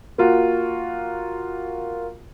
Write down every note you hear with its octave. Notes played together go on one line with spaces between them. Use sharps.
A#3 F4 F#4